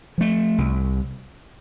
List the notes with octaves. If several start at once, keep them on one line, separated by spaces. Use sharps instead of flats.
F3 A3
C2